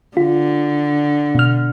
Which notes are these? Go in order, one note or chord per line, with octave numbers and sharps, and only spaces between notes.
D3 F4
B2 F6